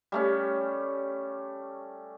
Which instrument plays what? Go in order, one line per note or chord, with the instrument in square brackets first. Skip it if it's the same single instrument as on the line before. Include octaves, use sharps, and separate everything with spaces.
[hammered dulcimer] G3 A3 C#4